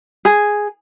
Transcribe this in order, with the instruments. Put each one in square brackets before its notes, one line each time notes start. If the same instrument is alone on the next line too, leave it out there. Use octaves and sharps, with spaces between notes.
[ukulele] G#4